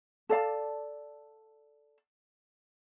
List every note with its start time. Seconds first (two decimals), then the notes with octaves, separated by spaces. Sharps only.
0.29 A4 D5 F5 A5